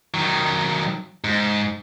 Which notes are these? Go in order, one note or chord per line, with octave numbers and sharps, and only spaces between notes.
D#3 F#3
G#2